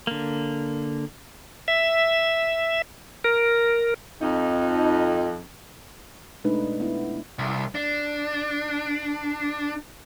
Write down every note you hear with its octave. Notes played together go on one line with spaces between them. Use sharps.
D3 A#3
E5
A#4
F2 D#4
B2 G#3 A3 D4 D#4 B4
B3 E4
C2
D4